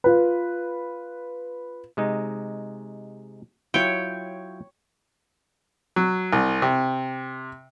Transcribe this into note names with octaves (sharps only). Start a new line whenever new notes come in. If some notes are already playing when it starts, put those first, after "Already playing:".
F4 B4
C3 G#3 D#4
F#3 E4 F4 C#5 G5
F#3
C2
C3